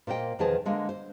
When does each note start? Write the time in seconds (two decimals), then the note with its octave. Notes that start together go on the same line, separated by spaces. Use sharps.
0.07 A#2 A#3 C5 D#5 G5
0.39 E2 D#3 F3 G#4 A5
0.66 D3 G#3 A#3
0.89 C5